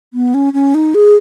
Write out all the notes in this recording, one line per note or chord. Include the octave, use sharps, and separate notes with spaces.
B3
C#4
C#4
D#4
G#4